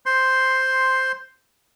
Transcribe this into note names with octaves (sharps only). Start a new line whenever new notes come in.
C5 C6